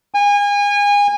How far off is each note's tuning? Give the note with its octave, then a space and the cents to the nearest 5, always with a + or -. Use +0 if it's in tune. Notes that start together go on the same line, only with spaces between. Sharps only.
G#5 -30